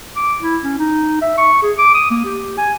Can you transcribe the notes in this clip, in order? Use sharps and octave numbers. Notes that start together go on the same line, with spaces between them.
D6
E4
C#4
D#4
E5
C#6
G#4
D6
D#6
A#3
G4
G#5